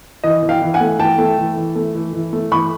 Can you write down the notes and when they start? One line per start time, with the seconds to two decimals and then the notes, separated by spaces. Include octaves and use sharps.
0.24 E3 D#5
0.43 E3
0.49 F5 G5
0.62 E3
0.74 F#5 G#5
0.81 A3
0.99 E3 G5 A5
1.18 A3
1.38 E3
1.57 E3
1.76 A3
1.95 E3
2.13 E3
2.33 A3
2.52 E3 B5 C#6